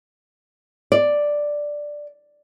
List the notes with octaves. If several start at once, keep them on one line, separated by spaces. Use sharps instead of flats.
D5